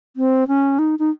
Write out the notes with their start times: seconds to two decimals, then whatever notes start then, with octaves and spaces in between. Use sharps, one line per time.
0.16 C4
0.48 C#4
0.79 D#4
0.99 D#4